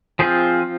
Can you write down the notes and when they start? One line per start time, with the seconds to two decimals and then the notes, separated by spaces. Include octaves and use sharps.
0.19 F3 C4 F4 G#4 C5